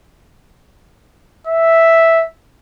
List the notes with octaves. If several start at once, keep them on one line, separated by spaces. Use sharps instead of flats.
E5